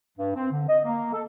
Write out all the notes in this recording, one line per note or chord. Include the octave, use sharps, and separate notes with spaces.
G2
C4
D3
D#5
A#3
A4